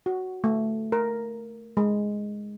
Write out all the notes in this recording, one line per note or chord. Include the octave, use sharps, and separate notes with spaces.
F#4
A3
A#4
G#3